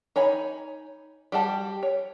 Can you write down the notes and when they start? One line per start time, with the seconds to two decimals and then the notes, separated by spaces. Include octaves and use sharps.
0.16 D#4 C#5 G#5 B5
1.32 G3 F#4 G4 A5
1.83 C#5